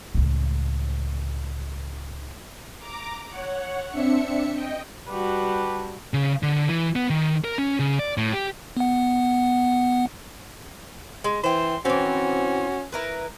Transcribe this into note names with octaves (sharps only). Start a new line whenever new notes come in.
C#2 A2
A#5 D6
C#5 F#5
C4 D4 E5 C#7
D#5 G5
G3 D4 F#4 G4 B4
C#3
D3
E3
B3
D#3
A#4
C#4
C#3
D5
A2
G4
B3 F#5
G#3
E3 C5 G5 C6
E3 C4 C#4 F#4
E4 A#4 B4